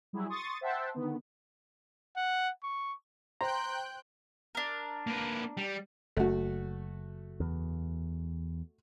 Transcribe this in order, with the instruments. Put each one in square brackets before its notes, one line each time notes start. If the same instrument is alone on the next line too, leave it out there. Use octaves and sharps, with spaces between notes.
[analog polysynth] F#3 G3 E4 G#4
C6 C#6 D#6 A6
C5 E5 F#5 G5 A5 C6
D3 D#3 B3
[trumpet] F#5
C#6
[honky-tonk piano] C5 [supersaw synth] G5 F#6 G6 [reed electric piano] A#5 [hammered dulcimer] C6
[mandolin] D4 A#4
[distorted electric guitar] A#3 B4
G3
[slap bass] F#1 [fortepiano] A3 F#4
[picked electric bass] E2